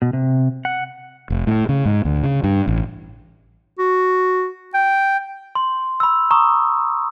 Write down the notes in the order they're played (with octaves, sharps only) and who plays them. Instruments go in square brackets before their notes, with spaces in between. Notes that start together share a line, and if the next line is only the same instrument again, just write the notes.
[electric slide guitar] B2
C3
F#5
[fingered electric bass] F1
A2
C#3
G#2
D2
C#3
G2
A1
[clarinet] F#4
G5
[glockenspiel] C6
B5 E6
A#5 C#6 D#6